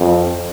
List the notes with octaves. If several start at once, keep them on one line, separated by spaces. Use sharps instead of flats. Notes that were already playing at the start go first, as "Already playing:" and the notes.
Already playing: F2